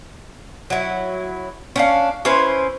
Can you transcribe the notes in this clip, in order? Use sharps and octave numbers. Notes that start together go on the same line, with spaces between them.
F#3 E4
C#4 D4 F5
C#4 E4 B4 C5